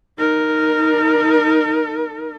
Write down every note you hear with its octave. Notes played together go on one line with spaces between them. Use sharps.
D#4 A#4